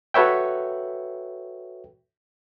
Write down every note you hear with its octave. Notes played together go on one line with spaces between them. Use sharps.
F#4 A4 B4 C#5 E5 G5